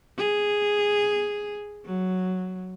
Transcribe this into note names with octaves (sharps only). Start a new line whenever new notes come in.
G#4
F#3